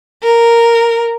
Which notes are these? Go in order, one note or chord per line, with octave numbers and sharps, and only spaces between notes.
A#4